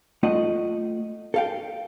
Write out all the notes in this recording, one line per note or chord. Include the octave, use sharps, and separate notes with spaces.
A3 F4 D#5 F#5
A4 F5 G5